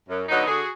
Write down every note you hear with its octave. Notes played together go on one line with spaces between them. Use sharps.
F#2
D3 F#3 B3 D#4
D3 F#4 G#4